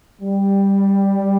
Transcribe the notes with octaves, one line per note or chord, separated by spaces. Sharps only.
G3